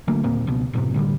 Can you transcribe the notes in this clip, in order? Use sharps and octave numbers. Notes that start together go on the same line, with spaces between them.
D3 F#3 A3 A#3
D#1 A#2 A#3 C4
C#2 B2
F#1 A2 C3
A2 D3 F#3 G3